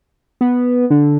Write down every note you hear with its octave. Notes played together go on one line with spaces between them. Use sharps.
B3
D3